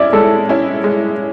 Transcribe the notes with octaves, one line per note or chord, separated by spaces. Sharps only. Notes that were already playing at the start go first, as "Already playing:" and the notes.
Already playing: C#4 E4 D5 E5
G#3 A4
C#4 E4
G#3